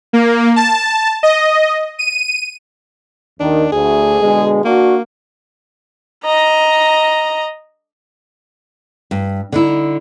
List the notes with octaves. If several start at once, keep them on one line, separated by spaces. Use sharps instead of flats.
A#3
A5
D#5
D#7
D#2 D#3 D4
D2 G#4
B2 D3 G#3
A#3 D4 F#4
D#5 A#5
G2
D3 D#4 E4